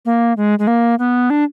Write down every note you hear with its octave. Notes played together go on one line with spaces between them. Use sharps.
A#3
G#3
G#3
A#3
B3
D4